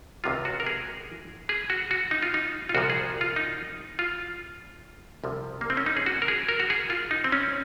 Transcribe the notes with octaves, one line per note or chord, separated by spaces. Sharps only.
C#2 C3 D#3 F#3 F4
F#4
A#4
G#4
G#4
F#4
F#4
D#4
F4
D#4
F4
C2 A#2 F3 F#4
G#4
F4
D#4
F4
C2 C3 F3
A#3
C4
C#4
D#4
G#4
F#4
A#4
G#4
A#4
F#4
G#4
F4
D#4
C4
C#4